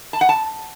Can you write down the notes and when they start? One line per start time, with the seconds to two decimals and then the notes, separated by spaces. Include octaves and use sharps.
0.13 A5
0.21 F#5
0.29 A5